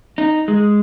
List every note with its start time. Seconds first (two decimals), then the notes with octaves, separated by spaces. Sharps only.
0.18 D#4
0.48 G#3